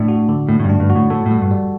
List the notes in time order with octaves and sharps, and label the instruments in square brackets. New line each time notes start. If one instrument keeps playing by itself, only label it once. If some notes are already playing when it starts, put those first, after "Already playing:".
Already playing: [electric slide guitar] A2 [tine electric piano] D4
[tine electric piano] F#4
D3
[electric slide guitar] A2 [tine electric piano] A3
[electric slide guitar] A2
G2
[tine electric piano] D4
[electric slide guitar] G2
[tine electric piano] F#4
[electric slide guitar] A2
[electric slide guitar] A2 [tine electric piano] A4
[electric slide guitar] A2
[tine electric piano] G3
[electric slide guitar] G2
[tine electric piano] G3